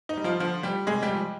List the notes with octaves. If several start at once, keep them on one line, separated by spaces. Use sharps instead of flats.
D#4
G3
F3 F4
D3 F3 F4
G3 G4
C3 G#3 G#4
G3 G4
F3 G#3